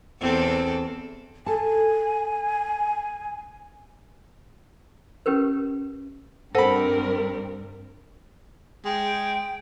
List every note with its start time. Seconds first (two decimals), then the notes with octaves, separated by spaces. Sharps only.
0.21 E2 C4 A4
1.46 A4 G#5 A5
5.26 C#4 G4 A#4 B4
6.55 G2 C4 A4 A#4 C5 F#5 B5
8.85 G#3 G5